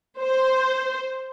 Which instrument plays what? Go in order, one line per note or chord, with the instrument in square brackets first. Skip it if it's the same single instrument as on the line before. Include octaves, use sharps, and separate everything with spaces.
[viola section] C5